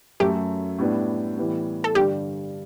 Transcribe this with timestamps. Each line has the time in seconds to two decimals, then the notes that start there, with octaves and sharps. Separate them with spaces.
0.20 F#2 F#3 A3 G4
0.78 A2 G3 B3 D4
1.37 A2 E3 G3 B3
1.84 A4
1.95 G2 D3 G3 G4